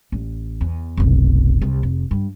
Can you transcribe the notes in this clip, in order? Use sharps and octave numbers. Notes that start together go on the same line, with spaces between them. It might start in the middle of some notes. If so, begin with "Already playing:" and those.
A1
E2
F1 B1
C2
F1
G2